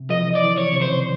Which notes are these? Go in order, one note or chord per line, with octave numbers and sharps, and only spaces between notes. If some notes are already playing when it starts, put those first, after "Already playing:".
Already playing: C3
F3 D#5
E3
D5
E3
D#3
C#5
C3
C#3 C5